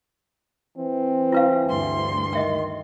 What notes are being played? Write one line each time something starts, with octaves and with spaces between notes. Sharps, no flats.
E3 C4
E4 B4 F5
D2 G2 C6
D#3 D#5 E5 G5